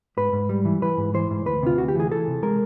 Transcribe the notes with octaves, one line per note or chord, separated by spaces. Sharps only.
G#2 B4
G#2
G3
E3
E3 B4
G#2
E3 C5
G#2
D2 B4
C3 F4
D2 F#4
G4
E3 G#4
E3 A4
C3
G#3 A#4